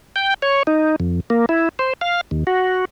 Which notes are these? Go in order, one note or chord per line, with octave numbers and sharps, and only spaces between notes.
G5
C#5
D#4
F2
A#3
E4
C5
F5
D#2
F#4